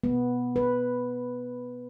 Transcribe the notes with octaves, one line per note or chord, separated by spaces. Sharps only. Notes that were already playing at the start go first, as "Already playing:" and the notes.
B3
B4